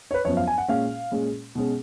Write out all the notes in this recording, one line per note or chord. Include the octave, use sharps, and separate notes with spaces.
C#5
B4
F#2 F3 B3 C#5
F5
G#5
F#5
A#2 G#3 C#4 F5
A#2 G#3 C#4
B2 G#3 C#4